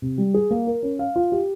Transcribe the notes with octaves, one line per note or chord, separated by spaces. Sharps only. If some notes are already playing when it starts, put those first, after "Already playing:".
C3
G3
G#4
A#3
A#4
C#4
F5
F4
G4